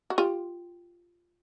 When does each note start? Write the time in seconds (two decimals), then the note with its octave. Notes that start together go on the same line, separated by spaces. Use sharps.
0.10 F#4
0.18 F4 G4